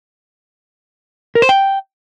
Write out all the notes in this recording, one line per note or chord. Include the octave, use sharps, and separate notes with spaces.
A#4
C5
G5